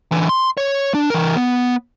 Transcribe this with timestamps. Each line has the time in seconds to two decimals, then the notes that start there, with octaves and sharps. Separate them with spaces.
0.12 D3 E3
0.29 C6
0.57 C#5
0.94 D4
1.10 E3 A#4
1.36 B3